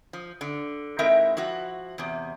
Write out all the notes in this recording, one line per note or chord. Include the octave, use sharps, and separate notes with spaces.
F3
D3
G#2 C4 E4 A#4 E5 G5
F3 E4 F#4
E2 C3